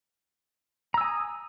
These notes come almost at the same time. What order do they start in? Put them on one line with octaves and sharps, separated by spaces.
A#5 E6 G#5 D#6